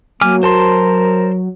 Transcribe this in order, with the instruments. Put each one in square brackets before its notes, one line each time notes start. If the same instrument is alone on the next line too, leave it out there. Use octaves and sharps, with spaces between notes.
[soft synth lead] F#3 [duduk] A#3 [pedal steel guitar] G#5 D6 F6
[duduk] A#4 [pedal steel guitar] C5 A5 C6